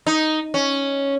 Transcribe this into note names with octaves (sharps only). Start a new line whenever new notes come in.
D#4
C#4